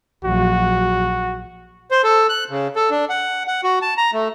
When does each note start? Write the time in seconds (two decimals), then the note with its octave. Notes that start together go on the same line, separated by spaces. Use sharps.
0.24 A#1 F#3 F#4
1.91 C5
2.04 A4
2.29 F#6
2.50 C#3
2.76 A4
2.90 D4
3.09 F#5
3.47 F#5
3.64 F#4
3.82 A5
3.97 A#5
4.13 A3